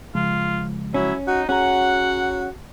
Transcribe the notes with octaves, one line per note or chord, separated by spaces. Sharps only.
C#3 F3 G#3 F4
F#3 C#4 E4
D#4 F#4
C#4 F#4 G#4 C#5 F#5 A#5